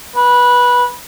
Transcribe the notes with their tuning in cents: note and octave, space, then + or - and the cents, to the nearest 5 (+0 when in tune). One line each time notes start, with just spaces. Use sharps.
B4 -15